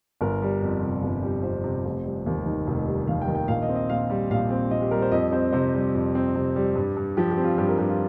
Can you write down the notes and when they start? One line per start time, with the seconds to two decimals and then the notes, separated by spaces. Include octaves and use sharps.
0.21 G1 A#4
0.42 G3
0.62 F2
0.82 C3
1.03 G1
1.23 G3
1.43 F2 C5
1.64 C3
1.85 F1
2.05 G3
2.26 D#2
2.46 D#3
2.67 F1
2.87 G3
3.07 D#2 F5
3.22 G5
3.28 D#3
3.35 G5
3.48 A#1 F5
3.62 D#5
3.69 C4
3.75 D#5
3.90 A#2 F5
4.10 G3
4.30 A#1 F5
4.50 C4
4.71 A#2 D#5
4.82 G4
4.91 G3 A#4
5.02 C5
5.12 F2 D#5
5.32 C4 C5
5.53 C3 C5
5.74 G3
5.95 F2
6.15 C4
6.35 C3
6.56 G3
6.75 G2
6.96 G2
7.17 F3 G4
7.31 G4
7.37 C4
7.44 F4
7.58 G2 G4
7.69 A#4
7.78 G2 G4
7.89 F4